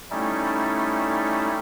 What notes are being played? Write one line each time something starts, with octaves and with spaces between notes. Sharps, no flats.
G3 A3 C#4 D#4 E4 A4